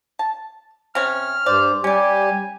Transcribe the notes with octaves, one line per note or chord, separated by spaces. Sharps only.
A5
C3 C#4 F6
G2 C5 D5
G3 C#4 G4 D5 G#5